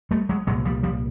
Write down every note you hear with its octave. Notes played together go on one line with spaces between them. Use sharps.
G3 A3
F#3 G#3
C2 A#2 F#3 G#3
F3 G3
F3 G3